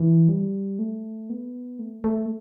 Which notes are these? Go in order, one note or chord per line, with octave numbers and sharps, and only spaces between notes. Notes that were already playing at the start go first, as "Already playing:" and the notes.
Already playing: E3
G3
A3
B3
A3
A3